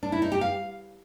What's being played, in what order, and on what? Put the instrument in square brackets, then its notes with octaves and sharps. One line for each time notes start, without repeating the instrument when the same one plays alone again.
[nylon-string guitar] D4
E4
D#4
G4
F5